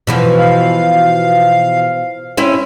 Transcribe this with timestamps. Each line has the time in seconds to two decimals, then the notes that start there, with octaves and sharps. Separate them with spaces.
0.07 B2 E3 F3
0.38 F5
2.37 C4 C#4 E4